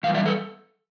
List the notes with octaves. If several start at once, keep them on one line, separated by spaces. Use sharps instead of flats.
G2 E3 G3 F5
D5 E5
A4 B4